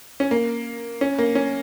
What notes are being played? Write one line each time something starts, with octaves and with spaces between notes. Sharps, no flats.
C#4
A#3
C#4
A#3
C#4